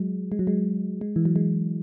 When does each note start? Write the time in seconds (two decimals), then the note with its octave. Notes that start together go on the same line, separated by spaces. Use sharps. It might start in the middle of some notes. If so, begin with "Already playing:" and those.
Already playing: F#3 G#3
0.32 G#3
0.39 F#3
0.47 G#3
1.01 G#3
1.16 E3
1.25 F#3
1.36 G#3